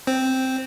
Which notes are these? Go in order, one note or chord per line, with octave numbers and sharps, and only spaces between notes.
C4